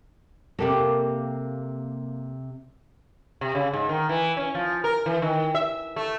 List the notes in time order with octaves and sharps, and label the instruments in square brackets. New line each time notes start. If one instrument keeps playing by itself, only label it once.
[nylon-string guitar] C3 A4 [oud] A#3 G4 D5
[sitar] C3
C#3
G#2
D#3
E3
C#4
F3
A#4
E3
D#3
E5
A3